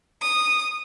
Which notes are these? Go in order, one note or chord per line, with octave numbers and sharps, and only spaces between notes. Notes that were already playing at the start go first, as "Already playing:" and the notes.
D#6